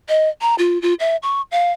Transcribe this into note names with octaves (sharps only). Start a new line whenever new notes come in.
D#5
A#5
F4
F4
E5
C#6
F5